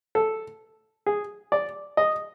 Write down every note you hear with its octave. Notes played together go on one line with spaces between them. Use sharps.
A4
G#4
D5
D#5